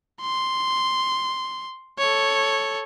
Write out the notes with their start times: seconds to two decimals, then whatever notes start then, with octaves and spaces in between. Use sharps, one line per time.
0.21 C6
1.99 A4 C#5